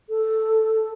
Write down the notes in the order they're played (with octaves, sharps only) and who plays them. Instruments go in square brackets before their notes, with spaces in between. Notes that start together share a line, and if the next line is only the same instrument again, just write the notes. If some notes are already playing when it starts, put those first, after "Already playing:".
[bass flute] A4